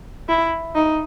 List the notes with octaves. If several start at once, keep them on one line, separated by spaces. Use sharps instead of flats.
E4
D#4